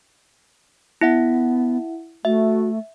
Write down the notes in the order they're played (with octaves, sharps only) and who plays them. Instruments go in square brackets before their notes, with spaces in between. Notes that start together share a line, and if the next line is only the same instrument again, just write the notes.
[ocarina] B3 [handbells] E4 E5 F#5
[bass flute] A3 [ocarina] F#4 [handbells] E5